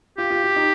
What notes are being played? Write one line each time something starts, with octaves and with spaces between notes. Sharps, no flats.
F4 G4
F4
F4
D#4